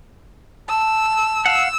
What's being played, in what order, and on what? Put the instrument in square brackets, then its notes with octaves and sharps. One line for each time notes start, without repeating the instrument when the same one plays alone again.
[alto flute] A5 [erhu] E6
[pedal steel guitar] F5 F#5 [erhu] E6